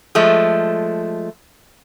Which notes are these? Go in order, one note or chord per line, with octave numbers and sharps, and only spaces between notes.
F3 G#3 A3